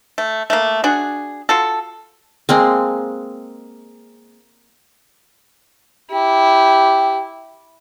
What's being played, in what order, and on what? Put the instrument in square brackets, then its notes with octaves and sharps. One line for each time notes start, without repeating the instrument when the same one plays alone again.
[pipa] A3
A3 A#3
D4 F#4 G#4
F4 F#4 A4
[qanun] G#3 A#3 C4
[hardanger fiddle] E4 [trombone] G4